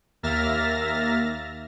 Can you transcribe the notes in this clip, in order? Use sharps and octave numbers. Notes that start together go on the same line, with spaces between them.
D#2 A#3 E5 F6 A6 A#6